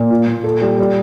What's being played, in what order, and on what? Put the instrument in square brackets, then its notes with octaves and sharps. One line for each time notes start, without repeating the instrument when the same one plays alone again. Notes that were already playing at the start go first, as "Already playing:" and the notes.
Already playing: [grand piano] A#2
F4
A#2
A4
G3
G3